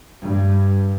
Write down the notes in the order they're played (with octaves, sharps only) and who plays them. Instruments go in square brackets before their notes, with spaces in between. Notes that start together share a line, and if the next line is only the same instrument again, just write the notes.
[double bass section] G2